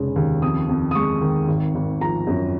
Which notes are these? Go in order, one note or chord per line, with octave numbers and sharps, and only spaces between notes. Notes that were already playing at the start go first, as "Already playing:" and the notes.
Already playing: F1 C#3 G#3
D#2
F2 D#6
F2
D#6
G#3 C#6
D#3
G#1
G#1
F3 A#5
F#2